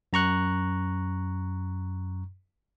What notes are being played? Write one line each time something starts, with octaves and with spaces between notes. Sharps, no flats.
F#2 A#5 C#6 F#6